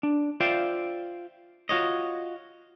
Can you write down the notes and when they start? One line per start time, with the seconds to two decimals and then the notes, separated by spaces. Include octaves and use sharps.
0.03 D4
0.40 F4 C5 D5 E5 F5 G5
1.69 F4 F#4 C#5 D#5